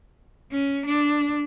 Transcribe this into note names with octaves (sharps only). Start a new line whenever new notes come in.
C#4
D4